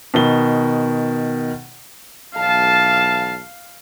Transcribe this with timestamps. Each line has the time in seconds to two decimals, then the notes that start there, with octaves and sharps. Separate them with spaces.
0.14 B2 D#3 G7
2.37 B1 E3 F5 A5